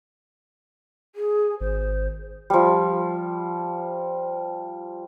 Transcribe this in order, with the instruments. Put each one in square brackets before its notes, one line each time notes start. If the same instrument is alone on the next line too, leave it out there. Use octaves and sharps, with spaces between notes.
[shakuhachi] G#4
[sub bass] G#1 [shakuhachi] C5
[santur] F3 G3